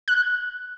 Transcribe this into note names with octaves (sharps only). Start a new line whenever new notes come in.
F#6